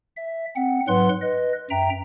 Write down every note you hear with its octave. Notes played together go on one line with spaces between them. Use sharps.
E5
C4 F#5
G#2 F#3 B4 F#5 C6
B4 D#5
F#2 E5 G5 A#5